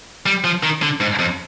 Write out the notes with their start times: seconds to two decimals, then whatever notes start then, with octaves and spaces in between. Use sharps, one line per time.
0.26 G3
0.44 F3
0.63 D#3
0.82 D3
1.00 G#2
1.19 F2